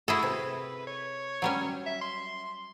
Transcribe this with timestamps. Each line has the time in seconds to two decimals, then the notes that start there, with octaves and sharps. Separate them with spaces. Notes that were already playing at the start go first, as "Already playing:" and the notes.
0.08 E4 F#4 G#4 A4
0.23 C3 B4
0.87 C#5
1.42 F#3 G3 C#4
1.86 E5
2.01 C6